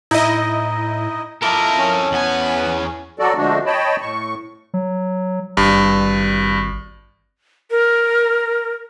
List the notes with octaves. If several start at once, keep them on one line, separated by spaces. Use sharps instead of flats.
A2 D#4 E4 D#5
E4 F4 A4 A#4 D#5 A5 D6
C#4
E2 B3 G#5
F#3 F#4 A4 D5
D3 F3 G#3 A3 D4 F#4
C#5 D#5 G5 A5 B5
A2 C#6
F#3
G#1 G2
A#4